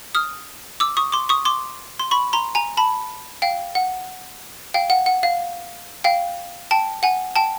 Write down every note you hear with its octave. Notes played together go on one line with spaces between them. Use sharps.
D#6 F6
D6 E6
C#6 D#6
C6 D6
C#6 D#6
C6 D6
C6
B5 C#6
A#5 C6
G#5 A#5
A5 B5
F5 G5
F#5
F5 G5
F#5
F#5
F5
F5 G5
G5 A5
F#5 G#5
G5 A5